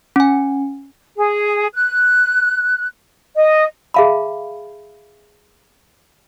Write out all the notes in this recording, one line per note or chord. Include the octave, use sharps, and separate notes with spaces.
C#4 G#5
G#4
F#6
D#5
G#4 E5 F5 A5 B5